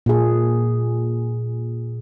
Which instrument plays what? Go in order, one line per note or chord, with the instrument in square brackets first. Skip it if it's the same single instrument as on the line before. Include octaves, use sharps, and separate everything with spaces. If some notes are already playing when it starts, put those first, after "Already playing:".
[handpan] A#2 G#4